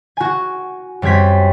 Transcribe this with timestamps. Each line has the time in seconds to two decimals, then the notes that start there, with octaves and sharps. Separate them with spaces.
0.17 F#4 G#5
1.02 F#2 G3 C4 G#6 B6